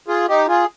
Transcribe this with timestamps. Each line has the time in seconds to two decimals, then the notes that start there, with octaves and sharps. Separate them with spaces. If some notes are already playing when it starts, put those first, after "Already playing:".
0.08 F4 G#4
0.29 D#4 G4
0.48 F4 G#4